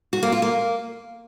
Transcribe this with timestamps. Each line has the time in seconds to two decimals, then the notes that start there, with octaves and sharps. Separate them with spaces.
0.13 F#4
0.23 A#3
0.32 F4
0.42 A#3